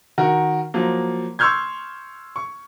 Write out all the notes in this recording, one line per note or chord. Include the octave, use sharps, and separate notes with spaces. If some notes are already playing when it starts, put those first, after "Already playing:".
D#3 F#4 A#4
F3 F#3 A#3
C6 C#6 E6 F6 G6 G#6
C#6